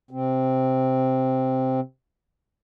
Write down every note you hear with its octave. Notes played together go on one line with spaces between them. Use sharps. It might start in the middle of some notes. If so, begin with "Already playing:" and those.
C3 C4